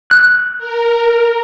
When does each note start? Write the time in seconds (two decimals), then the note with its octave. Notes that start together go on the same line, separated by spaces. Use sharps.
0.11 F#6
0.58 A#4